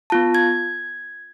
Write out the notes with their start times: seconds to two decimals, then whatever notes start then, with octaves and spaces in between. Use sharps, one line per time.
0.10 B3 F4 A5
0.35 G#6